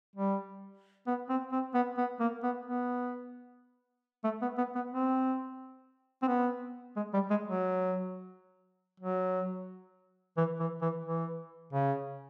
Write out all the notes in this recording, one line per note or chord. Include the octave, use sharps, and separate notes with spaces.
G3
B3
C4
C4
B3
B3
A#3
B3
B3
A3
B3
B3
B3
C4
C4
B3
G#3
G3
G#3
F#3
F#3
E3
E3
E3
E3
C#3